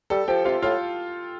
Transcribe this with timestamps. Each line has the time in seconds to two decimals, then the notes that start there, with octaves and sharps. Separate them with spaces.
0.10 G3 A4 A5
0.28 F3 G4 G5
0.45 C3 F4 F5
0.62 A2 F4 F5